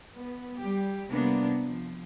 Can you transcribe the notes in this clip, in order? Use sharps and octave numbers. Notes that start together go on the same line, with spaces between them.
B3
G3 G4
C3 G3 A#3 B3 D4
F3